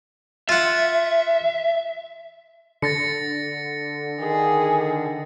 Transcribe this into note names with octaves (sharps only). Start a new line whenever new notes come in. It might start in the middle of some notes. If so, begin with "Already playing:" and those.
F4 E5 F#5
D3 A6 A#6 C#7
D#3 G#4